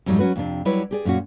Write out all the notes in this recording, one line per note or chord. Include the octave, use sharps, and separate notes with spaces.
F2 G#2 F#3 G3 D#4
F#3 C#4 F#4 B4
F2 C3 D4
F#3 G3 E4 B4 C#5 D5
G4 G#4 D5
F#2 A#2 C#4 F#4